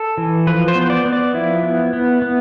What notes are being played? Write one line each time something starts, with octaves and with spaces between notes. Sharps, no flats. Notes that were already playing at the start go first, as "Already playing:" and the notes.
Already playing: A4
E3
F3 B4
C5
B3
C5
D5
B3
D5
F3 E4
B3
B3
B3